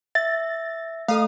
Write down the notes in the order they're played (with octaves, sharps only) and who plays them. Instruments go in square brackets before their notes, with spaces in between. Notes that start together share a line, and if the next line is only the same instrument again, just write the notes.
[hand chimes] E5 [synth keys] A6
[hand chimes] A3 A4 [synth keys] F5 D#6